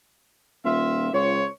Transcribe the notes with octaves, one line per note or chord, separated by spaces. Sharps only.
D#1 F4 E5
C#2 F4 C5 C#5